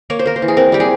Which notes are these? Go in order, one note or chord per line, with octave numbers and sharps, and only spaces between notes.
A#3 C#5
C5
A#3 A#4
C5
E3
G#4
C4 A#4
G3 G4
G#4